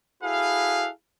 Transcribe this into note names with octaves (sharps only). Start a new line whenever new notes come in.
E4 F#4 G#4 A4 B4 F5